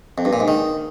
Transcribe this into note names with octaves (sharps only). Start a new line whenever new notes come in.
F2
G2
A#2
G#2
D#3